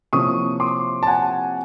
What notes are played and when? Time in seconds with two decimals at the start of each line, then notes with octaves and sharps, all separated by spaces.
0.13 C3 F3 A#3 C#4 E4 C#6 D#6
0.60 C6 D6
1.03 A5
1.07 F#5 G#5